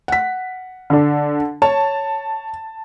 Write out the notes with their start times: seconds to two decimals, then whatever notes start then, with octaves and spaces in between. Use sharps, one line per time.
0.08 F#5 B6
0.90 D3 D4
1.62 C#5 A5